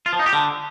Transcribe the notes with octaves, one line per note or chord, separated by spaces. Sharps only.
F4
F3
D#4
G4
D3